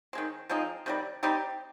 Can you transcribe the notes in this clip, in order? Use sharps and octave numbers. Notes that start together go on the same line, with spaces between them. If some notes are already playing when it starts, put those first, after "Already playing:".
D#3 G#3 C4
F3 G#3 C4 D#4
C3 D#3 G3
G3 C4 D#4 G4